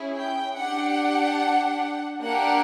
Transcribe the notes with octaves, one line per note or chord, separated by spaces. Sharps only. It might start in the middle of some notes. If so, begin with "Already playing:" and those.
Already playing: C#4 E4 G#4
G5
D4 G4 F#5
A#3 D4 G4 F#5